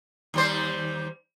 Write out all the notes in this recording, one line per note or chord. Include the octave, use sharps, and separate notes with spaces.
D#2 G3 C5